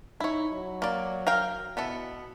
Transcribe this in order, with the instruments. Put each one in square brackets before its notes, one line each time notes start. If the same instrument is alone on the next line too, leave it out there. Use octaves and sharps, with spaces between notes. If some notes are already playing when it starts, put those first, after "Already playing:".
[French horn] D#4 [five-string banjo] E4 C#5
[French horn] F#3
[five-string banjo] A#3 D5
A#4 F5 G5
[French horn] B2 [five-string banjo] B3 E4 A4